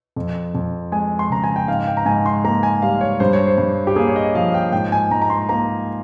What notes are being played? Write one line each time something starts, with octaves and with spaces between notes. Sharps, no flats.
F2
F2
G#3 G#5
C6
C#3 A#5
G#5
G5
G#2 F5
G5
A#5
G#2 G#5
C6
A#3 A#5
G#5
G3 F5
C#5
G2 C5
C#5
C5
G2
G4
A#3 G#4
C#5
D#5
F3 F5
G5
G#2 G5
G#5
G#2 A#5
A#5
C6
A#3 A#5